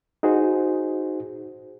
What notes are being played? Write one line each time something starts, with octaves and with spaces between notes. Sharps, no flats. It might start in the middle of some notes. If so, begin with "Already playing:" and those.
D#4 F#4 G#4 C5